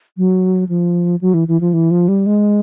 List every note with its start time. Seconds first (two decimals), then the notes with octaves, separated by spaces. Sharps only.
0.17 F#3
0.69 F3
1.21 F#3
1.34 E3
1.48 E3
1.61 F3
1.73 E3
1.91 F3
2.08 G3
2.26 G#3